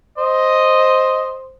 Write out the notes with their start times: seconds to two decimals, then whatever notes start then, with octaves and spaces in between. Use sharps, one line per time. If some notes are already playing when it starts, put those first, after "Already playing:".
0.18 C5 D#5